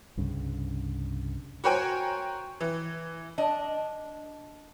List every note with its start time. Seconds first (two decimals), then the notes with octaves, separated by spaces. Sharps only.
0.17 C2 G2 C#3
1.64 F#4 A#4 C5 C#5 G5 G#5
2.60 E3
3.38 D4 D#5